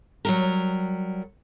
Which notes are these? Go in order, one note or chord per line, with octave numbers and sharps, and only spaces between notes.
F#3 G3 A#4